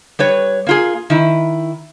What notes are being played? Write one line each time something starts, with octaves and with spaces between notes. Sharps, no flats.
G3 B4 C#5
A#3 F4 G#4
D#3 E4